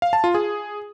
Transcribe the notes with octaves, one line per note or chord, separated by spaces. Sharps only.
F5
A5
F4
G#4